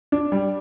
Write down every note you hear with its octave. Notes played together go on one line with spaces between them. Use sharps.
D4
G3